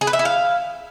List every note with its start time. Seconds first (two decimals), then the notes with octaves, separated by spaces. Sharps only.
0.01 G#4
0.07 B4
0.13 E5
0.19 E4
0.25 F5